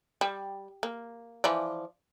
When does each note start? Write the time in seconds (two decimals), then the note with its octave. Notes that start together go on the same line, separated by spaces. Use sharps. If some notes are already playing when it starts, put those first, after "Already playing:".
0.21 G3
0.83 A#3
1.44 E3 F3 D5